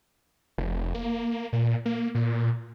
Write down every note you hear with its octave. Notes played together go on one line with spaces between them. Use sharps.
F1
A#3
A#2
A#3
A#2